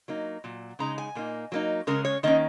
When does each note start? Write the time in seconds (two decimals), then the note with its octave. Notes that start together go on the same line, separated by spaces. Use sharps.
0.08 F#3 A#3 D#4
0.44 A#2 F#3
0.79 C#3 G#3 D#4 A#5
0.98 G#5
1.15 A#2 A#3 D#4
1.52 F#3 A#3 D#4
1.87 C#3 G#3 C#4 A#4
2.05 C#5
2.23 D#3 A#3 C#4 D#5